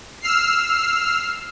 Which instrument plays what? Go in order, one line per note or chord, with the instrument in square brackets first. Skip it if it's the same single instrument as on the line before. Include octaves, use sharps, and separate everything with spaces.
[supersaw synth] E6 F6 C7